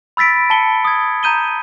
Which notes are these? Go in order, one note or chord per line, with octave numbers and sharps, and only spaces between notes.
B5 E6 A6 B6 D7
A5 B5 C#7 G7
D#6 G#6
A#5 G6 D#7 G7